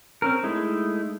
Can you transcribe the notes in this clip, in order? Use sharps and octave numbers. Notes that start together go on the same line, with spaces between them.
C4 C#4 A#4
G#3 A3 D#4 E4